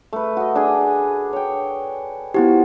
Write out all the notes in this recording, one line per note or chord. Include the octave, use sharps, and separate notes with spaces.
A3 B4
F#4 D#5
D4 G#4
C#5 G5
F3 B3 E4 F#4 G4